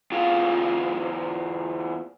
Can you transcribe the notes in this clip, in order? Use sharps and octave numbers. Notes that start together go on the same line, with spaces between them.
E2 F4